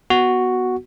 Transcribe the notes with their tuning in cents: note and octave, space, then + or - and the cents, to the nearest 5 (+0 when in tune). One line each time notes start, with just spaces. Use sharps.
B3 -5 F#4 +0